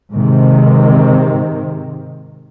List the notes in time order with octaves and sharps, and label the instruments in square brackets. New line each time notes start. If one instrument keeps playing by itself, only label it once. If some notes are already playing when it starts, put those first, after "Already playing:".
[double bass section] G#2 C3 D#3